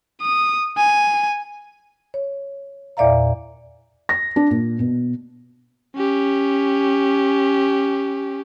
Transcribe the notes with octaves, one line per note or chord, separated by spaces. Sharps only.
D#6
G#5
C#5
E2 A#2 D5 E5 F5 A#5
A#6
D4
A#2
B2
C#4 G4